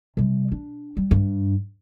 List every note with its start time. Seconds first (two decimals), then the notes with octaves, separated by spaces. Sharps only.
0.17 C3 G3
0.52 D4
0.97 G3
1.11 G2